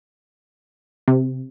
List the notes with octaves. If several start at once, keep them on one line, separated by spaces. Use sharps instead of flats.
C3